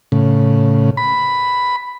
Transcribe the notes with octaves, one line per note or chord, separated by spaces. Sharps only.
A2 C#3
B5